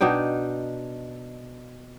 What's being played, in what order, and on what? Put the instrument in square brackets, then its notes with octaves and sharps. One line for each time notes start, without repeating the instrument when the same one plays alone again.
[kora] B2 D4 D#4 G5